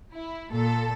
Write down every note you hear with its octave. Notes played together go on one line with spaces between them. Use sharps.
E4
A#2 A4